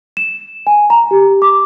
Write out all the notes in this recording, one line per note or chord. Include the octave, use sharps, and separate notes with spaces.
E7
G#5
A#5
G4
D6